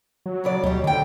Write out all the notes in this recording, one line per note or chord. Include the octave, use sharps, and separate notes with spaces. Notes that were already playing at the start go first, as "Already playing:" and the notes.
F#3
F#2 C#3 D5
D2 B2 G3
F2 D3 G5